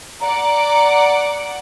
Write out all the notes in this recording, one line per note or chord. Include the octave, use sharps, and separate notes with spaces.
D5 F#5 A#5 D6